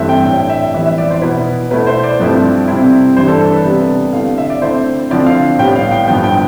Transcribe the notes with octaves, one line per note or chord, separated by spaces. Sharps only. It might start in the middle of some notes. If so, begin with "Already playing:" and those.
Already playing: G2 E3 A3 C4 E4 E5
G5
A2 G3 D4 G5
E5
F2 E3 G3 B3 E4 E5
E5
D5
C5
B2 B3 E4 B4
B2 A3 E4 B4
C5
D5
G2 F3 A3 C4 E4
C3 G3 C4 E4
G2 E3 G3 D4 C5
A4
A4
B4
C3 G3 B3 D4
D3 A3 C4 E4 F5
F5
E5
D5
D3 A3 C4 E4 C5
D3 F3 C4 E4 D5
F5
A2 G3 B3 G5
F5
G5
G2 D3 F3 B3 G5
G5